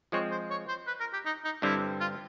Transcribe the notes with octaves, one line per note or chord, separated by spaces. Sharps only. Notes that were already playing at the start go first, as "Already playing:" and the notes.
F3 G#3 C4 C#5
C5
C#5
C5
B4
A#4
G4
D#4
D#4
G2 D3 G3 C4 E4
F4